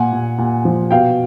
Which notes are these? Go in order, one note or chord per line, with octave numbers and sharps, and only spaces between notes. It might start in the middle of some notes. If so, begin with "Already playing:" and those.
Already playing: A#2 F#5 G#5
A#2
A#2
F3
B2 F5 G5